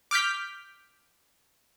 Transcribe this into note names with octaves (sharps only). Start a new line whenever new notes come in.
D6 F6 G6 B6